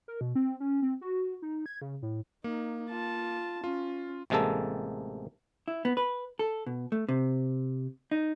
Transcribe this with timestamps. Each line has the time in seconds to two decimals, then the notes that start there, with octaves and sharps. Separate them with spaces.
0.08 A#4
0.21 B2
0.35 C4
0.60 C#4
0.82 C4
1.01 F#4
1.42 D#4
1.66 G#6
1.81 C#3
2.02 A2
2.44 A#3 D#4
2.89 F4 A5
3.64 C#4 F4
4.30 A1 C3 G#3 A#3 A4 A5
5.68 E4
5.85 B3
5.97 B4
6.39 A4
6.66 B2
6.92 A3
7.09 C3
8.11 D#4